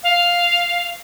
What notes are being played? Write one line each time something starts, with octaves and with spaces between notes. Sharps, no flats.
F5